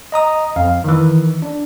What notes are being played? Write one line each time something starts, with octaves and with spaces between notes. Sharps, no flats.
D#5 A#5 D#6
F2 F5
D#3 E3
D4